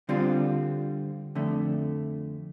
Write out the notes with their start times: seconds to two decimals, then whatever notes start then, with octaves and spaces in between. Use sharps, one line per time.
0.09 D3 G3 C4 F4
1.35 F2 D3 A3